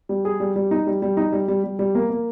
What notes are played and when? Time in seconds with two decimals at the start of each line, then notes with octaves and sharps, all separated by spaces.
0.09 G3
0.25 G#4
0.40 G3
0.56 G3
0.71 D#4
0.87 G3
1.02 G3
1.17 D#4
1.32 G3
1.48 G3
1.64 G3
1.79 G3
1.95 A#3
2.10 A#3